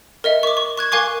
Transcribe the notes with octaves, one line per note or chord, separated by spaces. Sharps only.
A#4 D#5 E5
C#6 D6
C#6
C#6 F#6 G#6
A#4 F5 G#5 C#6 D6